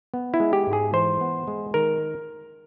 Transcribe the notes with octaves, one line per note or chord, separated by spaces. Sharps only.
B3
E4
G#3
G4
G#2
G#4
E3 C5
B3
G#3
D#3 A#4